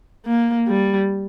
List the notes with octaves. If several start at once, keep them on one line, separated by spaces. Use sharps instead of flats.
A#3
G3